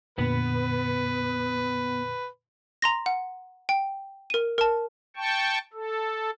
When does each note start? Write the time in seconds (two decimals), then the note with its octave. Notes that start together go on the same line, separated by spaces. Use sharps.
0.18 F2 A#2 D3 B3 B4
2.82 A#5 C6 A#6
3.06 F#5
3.69 G5
4.30 A#4 D#7
4.58 A#4 A5
5.16 G5 A5 C#6
5.73 A4